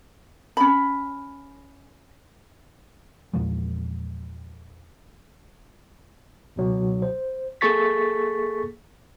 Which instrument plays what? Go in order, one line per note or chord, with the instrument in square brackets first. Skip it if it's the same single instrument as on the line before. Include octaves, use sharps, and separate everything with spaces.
[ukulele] C#4 B5
[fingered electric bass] E2 A#2 F3 G#3
[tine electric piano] C#2 B2 F#3
C5
A#3 G#4 A4 C#6 A6 B6